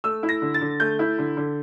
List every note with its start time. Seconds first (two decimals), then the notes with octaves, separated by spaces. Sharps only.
0.04 A3 E6
0.23 E4
0.29 A#6
0.42 D3
0.54 A6
0.61 D3
0.80 A3 G6
0.99 E4
1.18 D3
1.37 D3